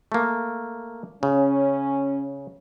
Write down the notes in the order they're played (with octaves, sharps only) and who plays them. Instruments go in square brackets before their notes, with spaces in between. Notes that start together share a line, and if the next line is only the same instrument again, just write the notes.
[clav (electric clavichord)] A3 A#3
[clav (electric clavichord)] C#3 [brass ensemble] C#4